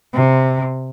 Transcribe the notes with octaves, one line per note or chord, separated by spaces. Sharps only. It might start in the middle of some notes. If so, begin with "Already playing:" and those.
C3